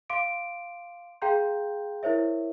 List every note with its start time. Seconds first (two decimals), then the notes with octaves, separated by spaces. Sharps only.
0.10 F5 C6 D6 D7
1.22 G#4 F5 G5 A#5 C6 G6
2.03 E4 A#4 C5 C#5 E5